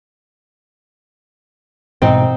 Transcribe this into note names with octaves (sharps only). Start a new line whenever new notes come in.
G#2 B2 E3 C4 D#4